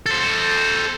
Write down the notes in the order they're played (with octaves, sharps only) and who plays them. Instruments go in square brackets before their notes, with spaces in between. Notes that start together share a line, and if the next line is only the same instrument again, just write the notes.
[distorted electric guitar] A4 C5